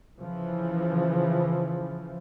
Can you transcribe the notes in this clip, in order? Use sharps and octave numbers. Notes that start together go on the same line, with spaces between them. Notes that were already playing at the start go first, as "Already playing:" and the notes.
C#3 E3 F3